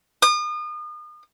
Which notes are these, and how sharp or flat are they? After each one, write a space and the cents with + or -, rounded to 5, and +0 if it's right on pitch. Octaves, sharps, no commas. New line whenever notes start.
D#6 -40